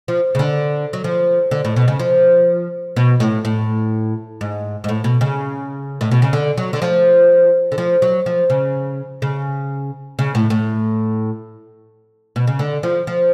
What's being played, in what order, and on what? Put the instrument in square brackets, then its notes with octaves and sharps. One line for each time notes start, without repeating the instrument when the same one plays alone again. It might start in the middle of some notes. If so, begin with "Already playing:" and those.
[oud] F3
C#3
D3
F#3
F3
D3
A2
B2
C#3
F3
B2
A2
A2
G#2
G#2
A2
B2
C#3
A2
B2
C#3
D3
F#3
D3
F3
D3
F3
F#3
F3
C#3
C#3
C#3
A2
A2
B2
C#3
D3
F3
F3